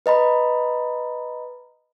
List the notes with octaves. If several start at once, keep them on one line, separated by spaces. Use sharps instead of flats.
B4 D#5 A#5 B5